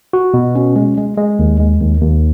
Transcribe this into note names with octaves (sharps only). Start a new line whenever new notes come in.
F#4
B2
C#4
G#3
G#3
G#3
D#2
G#3
D#2
D#2